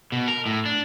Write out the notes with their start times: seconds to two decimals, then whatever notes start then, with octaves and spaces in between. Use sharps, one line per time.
0.12 B2
0.28 A#4
0.46 A2
0.65 D4